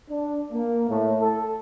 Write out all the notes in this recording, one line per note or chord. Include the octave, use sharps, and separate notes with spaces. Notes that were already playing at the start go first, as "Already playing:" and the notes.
D4
A#3
A2
A4